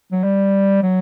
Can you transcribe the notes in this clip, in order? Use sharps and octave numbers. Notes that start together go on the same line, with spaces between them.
F#3
G3
F#3